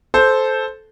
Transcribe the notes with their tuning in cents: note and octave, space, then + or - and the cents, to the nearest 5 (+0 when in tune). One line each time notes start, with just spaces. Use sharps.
A4 -15 C5 -5